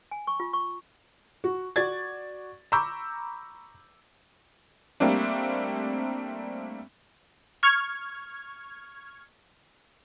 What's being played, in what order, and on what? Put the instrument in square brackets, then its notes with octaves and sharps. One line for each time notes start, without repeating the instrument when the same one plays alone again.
[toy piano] G#5
C#6
F4
C#6
[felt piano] F#4
F#4 D5 G#6 A6
A#5 B5 C#6 D6 E6 G6
[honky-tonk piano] G3 A3 A#3 C4 D4
[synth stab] C#6 F6 G#6